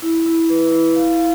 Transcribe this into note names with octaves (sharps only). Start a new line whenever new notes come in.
E4
E4
B4
E4
F5
F5